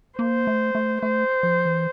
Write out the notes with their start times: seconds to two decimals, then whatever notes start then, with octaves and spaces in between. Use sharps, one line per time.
0.19 A#3 C5
0.47 A3
0.75 A3
1.02 A3 C5
1.43 F3
1.65 E3